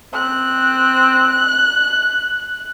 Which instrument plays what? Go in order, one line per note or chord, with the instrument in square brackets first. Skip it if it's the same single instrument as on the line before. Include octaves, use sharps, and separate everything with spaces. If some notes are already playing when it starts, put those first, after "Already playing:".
[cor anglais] C4 [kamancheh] F#6